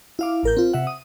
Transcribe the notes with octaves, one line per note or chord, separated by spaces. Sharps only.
E4 F5 D6
A1 A#4 G6
C4 F4
C3 E5 F#5
D#6